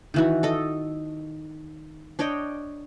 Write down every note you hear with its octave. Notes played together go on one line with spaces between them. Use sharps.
D#3 E3 F#4
A4 D#5
D4 C#5 D#5 G5